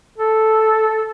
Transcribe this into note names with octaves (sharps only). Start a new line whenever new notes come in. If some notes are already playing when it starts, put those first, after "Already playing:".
A4